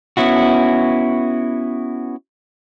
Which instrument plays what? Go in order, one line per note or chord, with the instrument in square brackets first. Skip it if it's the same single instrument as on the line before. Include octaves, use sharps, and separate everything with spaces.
[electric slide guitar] B3 C#4 E4 F#4